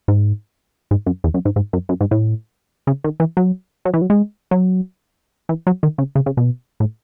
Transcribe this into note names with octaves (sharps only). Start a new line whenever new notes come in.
G#2
G#2
F#2
E2
F#2
G#2
G#2
F#2
F#2
G#2
A2
C#3
D#3
E3
F#3
F#3
E3
F#3
G#3
F#3
E3
F#3
D#3
C#3
C#3
C#3
B2
A2